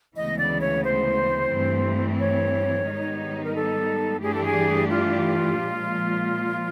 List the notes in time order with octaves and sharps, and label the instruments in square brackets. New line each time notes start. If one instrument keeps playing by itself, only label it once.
[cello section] D2 C#3 E3 G#3 B3 [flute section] D#5
[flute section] D5
C#5
C5
[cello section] G2 E3 A3 C4
[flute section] C#5
[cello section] G#2 D#3 G3 B3 D#4
[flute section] A#4
A4
[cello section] G2 E3 A3 D4 G4 [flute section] G#4
[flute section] A4
G#4
F4
[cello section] A#2 F3 G#3